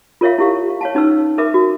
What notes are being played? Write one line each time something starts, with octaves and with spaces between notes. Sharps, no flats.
F4 A#4 C#5 E5 F5
E4 G4 F5
C#5 F5 A5
C#4 D#4 B4 E6
A#4 B4 E5 D6
F#4